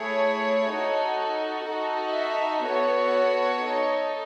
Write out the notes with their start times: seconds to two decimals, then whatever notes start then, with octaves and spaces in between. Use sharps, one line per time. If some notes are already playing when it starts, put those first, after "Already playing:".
Already playing: A3 E4 G#4 C#5
0.70 D#4 F#4 A4
1.66 D#4 F#4 A4
2.15 E5
2.64 B3 F#4 A4 C#5
3.62 D#4 A4